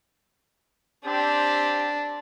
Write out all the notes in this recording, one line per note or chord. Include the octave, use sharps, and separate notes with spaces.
C4 D4 G4